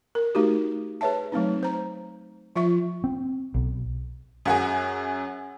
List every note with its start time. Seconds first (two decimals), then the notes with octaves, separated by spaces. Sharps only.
0.15 A#4
0.35 A3 D#4 F#4 G4
1.01 G#4 B4 C#5 E5 A5
1.32 F#3 A3 C4 D#4
1.63 C5 A#5
2.56 F3 F4 E5 C#6
3.04 C4
3.54 B1
4.45 F#2 F#4 G#4